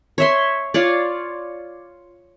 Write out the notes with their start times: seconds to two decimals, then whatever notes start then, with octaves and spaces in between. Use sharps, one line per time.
0.18 C#5 E5 C6
0.74 F4 C#5 D5